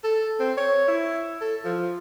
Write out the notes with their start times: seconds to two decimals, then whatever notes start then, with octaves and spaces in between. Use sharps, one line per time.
0.04 A4
0.40 C4
0.57 C#5
0.88 E4
1.41 A4
1.65 F3